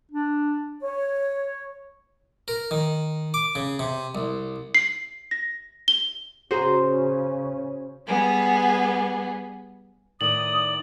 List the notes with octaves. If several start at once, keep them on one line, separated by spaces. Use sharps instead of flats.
D4
C#5
A#4
D#3
D6
C#3
C3
C2
C7
A#6
G7
C#3 C#4 F#4 G#4 C5 A#5
G3 B3 G#4
A2 D#3 D5 D#6 F#7